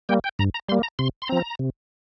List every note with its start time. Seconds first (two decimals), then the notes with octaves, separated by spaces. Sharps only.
0.09 G3 A#3 G5
0.24 G5
0.39 G2 A#5
0.54 A#5
0.69 G3 A#3 C6
0.83 A#5
0.99 C3 C6
1.22 C6
1.28 F3 C4 A#5
1.59 C3